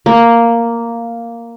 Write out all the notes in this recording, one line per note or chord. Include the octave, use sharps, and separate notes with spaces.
A#3